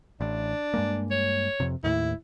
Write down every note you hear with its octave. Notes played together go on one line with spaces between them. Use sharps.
A1 D4
G2 G#3 A#3
C#5
F2 C3
D#2 A2 E4